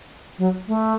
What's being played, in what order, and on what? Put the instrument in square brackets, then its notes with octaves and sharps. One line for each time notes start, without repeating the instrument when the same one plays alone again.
[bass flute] F#3
A3